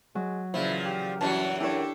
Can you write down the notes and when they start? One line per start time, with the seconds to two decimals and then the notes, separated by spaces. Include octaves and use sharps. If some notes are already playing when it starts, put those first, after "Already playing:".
0.15 F#3 G#3
0.54 A#2 C#3 E3 F3 E4
0.85 G4
1.21 F#2 E3 G3 D4 F#4 A5
1.60 D4 E4 G4 A4 C#5